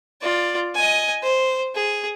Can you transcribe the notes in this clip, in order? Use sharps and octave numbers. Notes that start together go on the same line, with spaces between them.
F4 D5
D#5 G#5
C5
G#4